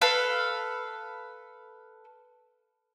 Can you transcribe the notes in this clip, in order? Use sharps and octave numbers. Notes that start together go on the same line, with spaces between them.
A4 B4 F5